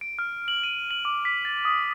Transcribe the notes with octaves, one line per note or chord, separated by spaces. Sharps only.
D7
F6
F#7
D#7
F#7
D6
B6
A6
D#6